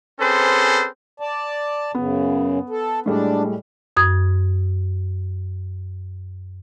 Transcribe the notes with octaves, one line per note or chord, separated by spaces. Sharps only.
C4 C#4 G#4 A4 B4 C5
D5 A5
F#2 C#3 B3
A4
A2 G3 G#3 D4
F#2 D#6 G#6